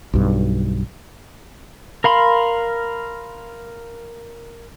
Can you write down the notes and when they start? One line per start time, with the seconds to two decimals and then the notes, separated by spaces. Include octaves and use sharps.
0.14 B1 G2
2.04 A#4 F5 B5 C6